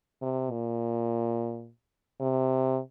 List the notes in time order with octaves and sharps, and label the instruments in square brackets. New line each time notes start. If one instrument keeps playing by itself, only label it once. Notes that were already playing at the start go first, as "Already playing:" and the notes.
[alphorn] C3
A#2
C3